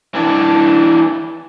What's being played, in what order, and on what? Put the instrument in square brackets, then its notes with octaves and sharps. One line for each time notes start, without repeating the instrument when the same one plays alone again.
[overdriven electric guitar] E3 D4